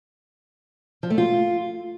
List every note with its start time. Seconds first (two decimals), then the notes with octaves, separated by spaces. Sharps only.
1.03 F3
1.10 A3
1.18 F4